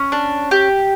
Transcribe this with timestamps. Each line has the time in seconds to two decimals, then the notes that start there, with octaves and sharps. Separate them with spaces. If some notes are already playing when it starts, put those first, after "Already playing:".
Already playing: C#4
0.12 D4
0.51 G4